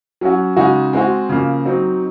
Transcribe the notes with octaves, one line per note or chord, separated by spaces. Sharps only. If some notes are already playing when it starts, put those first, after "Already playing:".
F#3 C#4 F#4
C#3 G#3 D#4 F#4
G#3 C4 F#4
C#3 F3 A#3
F#3 C4 D#4